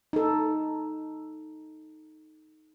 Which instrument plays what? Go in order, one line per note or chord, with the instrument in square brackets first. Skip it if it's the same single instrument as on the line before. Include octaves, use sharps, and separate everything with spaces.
[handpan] D#4 A4